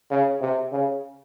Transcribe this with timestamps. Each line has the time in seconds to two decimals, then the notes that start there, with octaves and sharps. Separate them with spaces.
0.11 C#3
0.42 C3
0.73 C#3